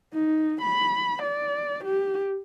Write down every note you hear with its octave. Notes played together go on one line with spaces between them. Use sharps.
D#4
B5
D5
G4